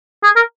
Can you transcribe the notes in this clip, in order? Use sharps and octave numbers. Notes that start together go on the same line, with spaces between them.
G#4
A#4